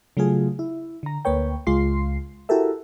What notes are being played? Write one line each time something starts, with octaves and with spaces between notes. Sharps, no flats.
C#3 F#3 A3 F4 G#4
E4
D3 A#5
D2 A#3 B4 C#5 G5
C#2 G#3 F4 C6 C7
E4 F#4 G4 A4 A#4 E5